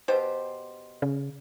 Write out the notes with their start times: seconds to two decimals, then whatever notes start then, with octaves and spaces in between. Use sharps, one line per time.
0.08 B2 G4 C5
1.02 C#3